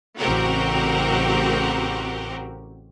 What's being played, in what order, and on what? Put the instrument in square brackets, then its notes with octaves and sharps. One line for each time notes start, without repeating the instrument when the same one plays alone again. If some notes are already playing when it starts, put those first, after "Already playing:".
[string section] A1 C#3 C4 F#4 G4 A#4